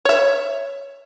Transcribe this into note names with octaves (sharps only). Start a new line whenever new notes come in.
C#5 E5